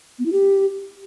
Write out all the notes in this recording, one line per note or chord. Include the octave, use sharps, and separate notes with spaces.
B3
E4
G4